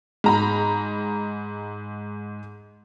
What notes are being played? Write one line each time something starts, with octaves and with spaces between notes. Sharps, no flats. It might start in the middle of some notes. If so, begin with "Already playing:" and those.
G#2 A#5 B5